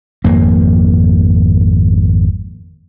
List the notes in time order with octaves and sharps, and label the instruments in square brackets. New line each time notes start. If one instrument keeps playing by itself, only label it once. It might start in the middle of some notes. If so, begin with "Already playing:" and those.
[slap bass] G#1 F2 A#3